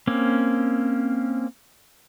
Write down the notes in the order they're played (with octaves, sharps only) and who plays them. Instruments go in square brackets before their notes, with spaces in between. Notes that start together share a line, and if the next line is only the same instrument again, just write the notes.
[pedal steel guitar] A#3 C4 C#4